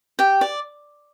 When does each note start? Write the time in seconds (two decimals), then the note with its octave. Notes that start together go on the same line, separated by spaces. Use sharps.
0.19 G4 G5
0.41 D5